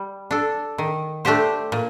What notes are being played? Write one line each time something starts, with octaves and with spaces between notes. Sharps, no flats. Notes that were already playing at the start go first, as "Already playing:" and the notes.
Already playing: G3
D4 A4
D#3
A3 D4 G4 C5
A#2